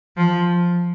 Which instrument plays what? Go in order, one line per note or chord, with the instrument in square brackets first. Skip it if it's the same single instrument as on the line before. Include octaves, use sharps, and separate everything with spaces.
[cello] F3